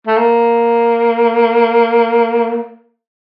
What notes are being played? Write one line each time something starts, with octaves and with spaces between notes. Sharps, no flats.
A3
A#3